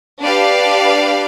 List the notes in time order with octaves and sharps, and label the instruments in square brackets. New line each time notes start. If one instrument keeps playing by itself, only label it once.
[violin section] D4 G4 B4 D5 F5